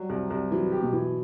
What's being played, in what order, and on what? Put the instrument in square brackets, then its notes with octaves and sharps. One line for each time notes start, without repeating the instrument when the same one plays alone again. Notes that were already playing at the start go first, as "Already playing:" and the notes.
Already playing: [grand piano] F#3 [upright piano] G3
[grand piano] C2
C2
[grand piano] E3 [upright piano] F#3
[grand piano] G4
[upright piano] B2
[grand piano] E3